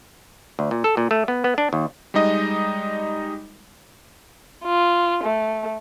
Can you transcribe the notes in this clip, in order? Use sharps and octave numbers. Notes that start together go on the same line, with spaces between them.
D2
A#2
A4
A#2
A3
B3
B3
D4
D#2
G3 G#3 D#4 D#5
F4
A3